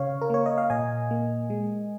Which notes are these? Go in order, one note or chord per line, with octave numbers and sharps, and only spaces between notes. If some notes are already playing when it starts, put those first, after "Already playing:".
Already playing: C#3 C#5 F5
A#4
A#3 C#5
D#5
F5
A#2 D#5 G#5
A#3
G#3